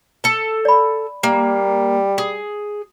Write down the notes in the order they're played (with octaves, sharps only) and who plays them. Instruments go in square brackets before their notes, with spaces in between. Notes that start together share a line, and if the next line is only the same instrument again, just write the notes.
[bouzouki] A4 A5
[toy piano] D5 B5
[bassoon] G3 [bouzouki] A#3
[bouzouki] G#4